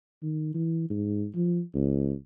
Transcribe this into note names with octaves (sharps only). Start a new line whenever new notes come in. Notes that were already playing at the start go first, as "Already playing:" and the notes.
D#3
E3
G#2
F3
C#2